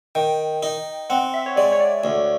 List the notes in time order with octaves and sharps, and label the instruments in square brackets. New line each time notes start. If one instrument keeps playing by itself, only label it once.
[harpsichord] D#3 [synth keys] G5
[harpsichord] D#4
[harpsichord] C4 [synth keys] F#5
[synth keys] E5
C#5
[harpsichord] G#3 [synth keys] D5
[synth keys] C#5
D5
[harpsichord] D2